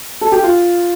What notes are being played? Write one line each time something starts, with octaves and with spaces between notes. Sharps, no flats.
A4
G4
F4